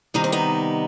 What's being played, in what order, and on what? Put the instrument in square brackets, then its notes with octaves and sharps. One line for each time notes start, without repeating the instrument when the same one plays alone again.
[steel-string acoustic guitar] C3 D#3 G3 D#4
C4
B3 D#4